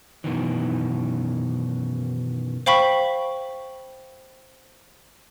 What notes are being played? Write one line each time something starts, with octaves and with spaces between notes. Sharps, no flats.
F#2 B2 D#3 E3
C5 F5 G5 B5 C#6 B6